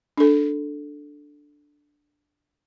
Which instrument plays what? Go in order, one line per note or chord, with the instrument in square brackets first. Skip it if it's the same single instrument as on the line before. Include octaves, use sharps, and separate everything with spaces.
[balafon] D4 A4